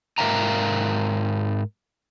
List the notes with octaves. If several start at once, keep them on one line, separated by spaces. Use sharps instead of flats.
G#2 A#4 E5 F5 G5 A#5